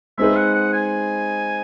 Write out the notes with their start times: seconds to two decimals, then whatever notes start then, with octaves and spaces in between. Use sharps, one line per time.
0.18 G#3 C4 D#4 G#4 B4 E5
0.36 F#5
0.55 F#5
0.73 G#5